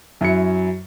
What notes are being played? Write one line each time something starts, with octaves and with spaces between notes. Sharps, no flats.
F#2 F#3 E4 C#7